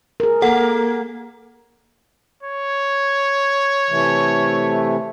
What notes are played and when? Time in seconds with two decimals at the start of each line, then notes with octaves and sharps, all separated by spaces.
0.20 G#4 A#4
0.42 A#3 A4 F#5
2.43 C#5
3.90 C3 E3 A3